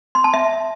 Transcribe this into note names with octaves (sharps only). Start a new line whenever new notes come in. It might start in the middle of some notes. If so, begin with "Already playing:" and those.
C6
A5
E5